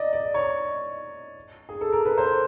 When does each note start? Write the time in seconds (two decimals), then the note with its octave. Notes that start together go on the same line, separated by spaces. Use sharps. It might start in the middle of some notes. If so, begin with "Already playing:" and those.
Already playing: D5 D#5
0.13 D5
0.34 C#5
1.69 G#4
1.81 A4
1.92 A#4
2.05 B4
2.18 C5